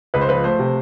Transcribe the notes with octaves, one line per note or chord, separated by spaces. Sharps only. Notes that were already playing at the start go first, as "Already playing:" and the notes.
C#2 B4
C5
F3 B4
A3 C5
C3